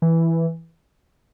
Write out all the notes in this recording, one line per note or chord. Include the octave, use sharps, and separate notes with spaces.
E3